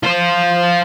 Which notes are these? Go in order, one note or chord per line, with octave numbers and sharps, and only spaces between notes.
F4 C5